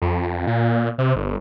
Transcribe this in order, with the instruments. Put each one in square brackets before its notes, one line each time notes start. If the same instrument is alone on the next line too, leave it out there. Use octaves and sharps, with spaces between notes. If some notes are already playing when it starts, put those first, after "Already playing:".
[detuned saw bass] F2
A#2
C3
G1